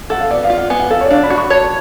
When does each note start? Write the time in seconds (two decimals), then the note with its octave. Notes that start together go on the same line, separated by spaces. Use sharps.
0.10 A4 F#5
0.20 F5
0.31 B3 D5
0.44 F5
0.50 F4
0.58 F#5
0.70 B3 G#5
0.80 F#5
0.90 A4 F5
1.01 C#5
1.05 D5
1.11 D4 F5
1.23 B5
1.30 F#4
1.38 C#6
1.50 C#5 A5